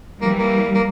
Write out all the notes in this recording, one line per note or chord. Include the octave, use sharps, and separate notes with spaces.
E3 G3 A#3
A#3
A#3